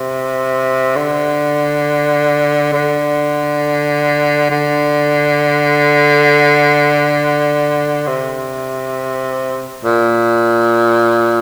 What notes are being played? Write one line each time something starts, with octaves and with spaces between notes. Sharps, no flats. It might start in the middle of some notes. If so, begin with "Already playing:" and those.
Already playing: C3
D3
D3
D3
C3
A#2